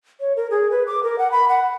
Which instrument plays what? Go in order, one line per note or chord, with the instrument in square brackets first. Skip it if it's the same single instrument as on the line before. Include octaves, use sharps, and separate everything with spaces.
[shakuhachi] C#5
A#4
G#4
B4
D6
A#4
F#5
B5
F#5